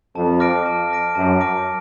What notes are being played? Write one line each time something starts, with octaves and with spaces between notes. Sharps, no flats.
F2 A5
D6 F6 A#6 D7
A5
D6 F6 A#6 D7
F#2 A5
D6 F6 A#6 D7